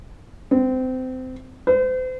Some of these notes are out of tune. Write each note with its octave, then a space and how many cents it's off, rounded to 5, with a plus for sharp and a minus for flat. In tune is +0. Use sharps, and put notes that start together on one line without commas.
C4 -25
C5 -40